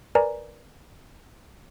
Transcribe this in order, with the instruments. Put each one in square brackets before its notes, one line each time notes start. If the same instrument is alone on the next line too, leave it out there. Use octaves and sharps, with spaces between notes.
[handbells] A#4 B4 D5 G#5 A#5